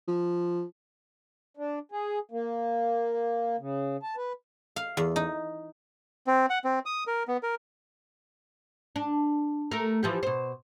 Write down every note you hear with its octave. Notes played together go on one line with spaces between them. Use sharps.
F3
D4
G#4
A#3
C#3
A5
B4
F5
E2
D#4
C4
F#5
C4
D#6
A#4
B3
A#4
D4
A3 A#4
E3 F3 G4
B2 C5